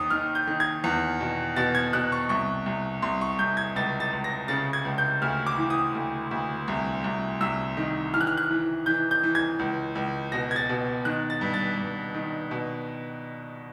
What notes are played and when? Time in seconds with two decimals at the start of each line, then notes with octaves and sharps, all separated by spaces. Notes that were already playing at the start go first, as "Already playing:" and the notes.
Already playing: D#2 D#3 D#6
0.10 D#3 F6
0.35 G6
0.47 D#3
0.60 G#6
0.84 E2
1.20 B2
1.56 B2 A6
1.75 G#6
1.93 B2 F#6
2.12 C#6
2.29 C2 C#6
2.66 C2
3.02 C2 C6
3.21 C#6
3.39 C2 G6
3.57 G#6
3.76 C#2 A6
4.00 A6
4.13 C#2
4.24 A#6
4.48 C#3 A6
4.73 G#6
4.85 C#2
4.98 G6
5.22 D2 F6
5.47 D6
5.58 E3
5.70 D#6
5.95 D2
6.31 D2
6.68 C2
7.04 C2
7.41 C2 E6
7.77 D#3
8.14 E3 F6
8.21 F#6
8.27 F6
8.37 F#6
8.51 E3
8.86 E3 G6
9.11 G6
9.23 E3
9.35 G#6
9.59 C#2
9.95 C#2
10.32 B2 A#6
10.51 G#6
10.56 A6
10.69 B2
11.05 D#3 F#6
11.30 A6
11.41 G2
11.54 A6
11.78 G2
12.15 D#3
12.51 B2